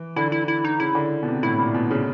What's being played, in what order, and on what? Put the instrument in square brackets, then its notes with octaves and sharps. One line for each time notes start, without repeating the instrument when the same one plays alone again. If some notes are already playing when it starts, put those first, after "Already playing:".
Already playing: [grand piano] E3
[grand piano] D3 [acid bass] E4
[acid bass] E4
E4
D#4
[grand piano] C#3 [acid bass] E4
[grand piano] D3
B2
C3
[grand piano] A2 [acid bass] E4
[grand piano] A#2
B2
C#3